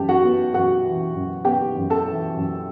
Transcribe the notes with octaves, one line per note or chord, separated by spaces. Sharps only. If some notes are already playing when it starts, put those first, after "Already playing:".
Already playing: F#2 E3 G4 A5
F#4 F#5
B3
F#2 F#4 F#5
E3
F#2
B3 G4 G5
F#2
A4 A5
E3
F#2